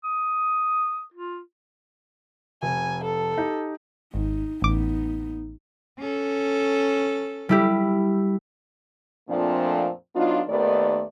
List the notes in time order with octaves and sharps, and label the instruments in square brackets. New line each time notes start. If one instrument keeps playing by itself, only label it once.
[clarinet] D#6
F4
[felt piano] F1 [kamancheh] G#5
[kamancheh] A4
[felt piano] D#4 G4
[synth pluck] G#1 [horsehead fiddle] D#4
[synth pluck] A1 D6 [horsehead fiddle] B3 D#4
[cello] C#4 A4
[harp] G3 E4 G4
[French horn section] F2 A#2 F3 A3 C4 D4
F#3 B3 D4 D#4 F4
D#2 D#3 A3 B3 D5